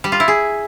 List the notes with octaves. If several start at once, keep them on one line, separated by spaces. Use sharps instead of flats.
G3
F4
E4
G#4